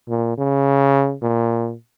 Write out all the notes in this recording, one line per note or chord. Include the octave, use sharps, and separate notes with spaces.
A#2
C#3
A#2